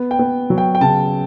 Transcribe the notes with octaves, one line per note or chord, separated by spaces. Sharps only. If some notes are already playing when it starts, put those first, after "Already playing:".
Already playing: B3
G5
B3
F#3
G5
G5
C#3 A5